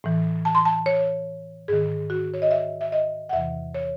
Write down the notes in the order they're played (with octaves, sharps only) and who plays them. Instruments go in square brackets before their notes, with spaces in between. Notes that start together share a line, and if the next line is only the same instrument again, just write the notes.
[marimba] A2 E3
A5
C6
A5
C#5
G#2 D#3 G#4
F#4
C#5
D#5
E5
E5
D#5
F#5
E2 C3 E3 E5
C#5